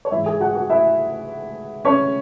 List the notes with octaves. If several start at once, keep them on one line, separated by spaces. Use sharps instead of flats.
C#5
G#2 E3 E4 E5
G#4 G#5
F#4 F#5
F#4 F#5
E4 E5
C#4 C#5